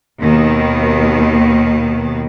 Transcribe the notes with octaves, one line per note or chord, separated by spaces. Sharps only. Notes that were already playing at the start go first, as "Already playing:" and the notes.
D#2 B2 D#3